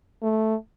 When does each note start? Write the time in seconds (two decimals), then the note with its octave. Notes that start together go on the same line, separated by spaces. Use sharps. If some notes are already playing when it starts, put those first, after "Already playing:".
0.22 A3